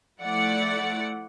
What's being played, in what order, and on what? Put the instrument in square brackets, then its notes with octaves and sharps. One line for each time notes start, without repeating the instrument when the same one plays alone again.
[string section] F3 A3 E4 D5 F#5